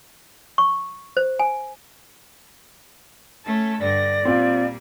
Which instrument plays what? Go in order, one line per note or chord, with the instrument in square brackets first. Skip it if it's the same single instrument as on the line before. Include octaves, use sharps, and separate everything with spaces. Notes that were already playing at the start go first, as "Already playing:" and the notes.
[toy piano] C#6
C5
G#5
[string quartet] A3 C#4 A4
[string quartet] G2 D3 A#6 [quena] D5
[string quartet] A#2 G3 [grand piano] C4 F4